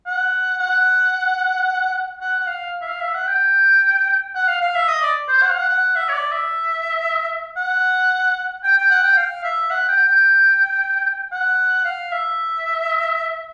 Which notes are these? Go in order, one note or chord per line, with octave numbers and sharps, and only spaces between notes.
F#5
F#5
F#5
F#5
F5
E5
F5
E5
F#5
G5
F#5
F5
F5
E5
D#5
D5
C5
F#5
F5
F#5
F#5
E5
C#5
D5
E5
F#5
G5
G5
F#5
G5
F5
E5
F#5
G5
G5
F#5
F5
E5